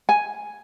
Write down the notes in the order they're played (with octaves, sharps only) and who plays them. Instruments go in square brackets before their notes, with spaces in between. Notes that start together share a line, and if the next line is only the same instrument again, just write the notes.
[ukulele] G#5